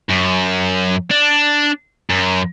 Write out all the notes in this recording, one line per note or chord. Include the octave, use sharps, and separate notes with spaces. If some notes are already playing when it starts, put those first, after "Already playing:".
F#2
D4
F#2